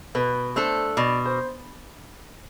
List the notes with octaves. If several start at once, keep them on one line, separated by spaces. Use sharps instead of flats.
B2 B4
A3 D4 A4 C5
B2 D5
C5